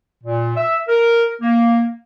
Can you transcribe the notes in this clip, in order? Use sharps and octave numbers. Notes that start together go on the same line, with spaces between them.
A#2
E5
A#4
A#3